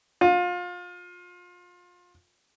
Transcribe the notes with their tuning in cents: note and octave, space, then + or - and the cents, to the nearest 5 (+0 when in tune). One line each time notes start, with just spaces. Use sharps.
F4 +30